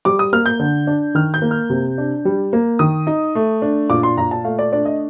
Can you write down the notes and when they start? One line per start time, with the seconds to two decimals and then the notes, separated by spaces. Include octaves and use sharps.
0.05 G3 D6
0.19 D#6
0.33 A#3 F6
0.46 G6
0.60 D3
0.87 D4
1.15 D#3 F6
1.34 G6
1.42 A#3
1.51 F6
1.70 C3
1.98 D4
2.25 G3
2.53 A#3
2.79 D#3 D#6
3.07 D#4
3.35 A3
3.62 D4
3.90 A#2 D6
4.03 C6
4.17 A#2 A#5
4.31 A5
4.44 A3 F5
4.59 D5
4.72 D4 D5
4.85 D#5